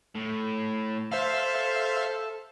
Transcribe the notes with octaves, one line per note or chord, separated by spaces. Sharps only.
A2
A4 C5 E5 F5